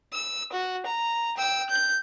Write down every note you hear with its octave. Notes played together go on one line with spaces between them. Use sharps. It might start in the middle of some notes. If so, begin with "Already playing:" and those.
E6
F#4
A#5
G5 E6
G6